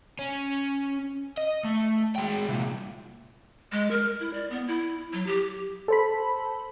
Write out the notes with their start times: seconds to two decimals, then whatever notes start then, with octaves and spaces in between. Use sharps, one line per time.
0.19 C#4
1.37 D#5
1.65 A3
2.16 G#3 G5
2.48 C2 A#2
3.72 G#3
3.91 A#4
4.20 E4
4.33 D5
4.51 B3
4.68 E4
5.13 F#3
5.27 G4
5.88 A4 C5 B5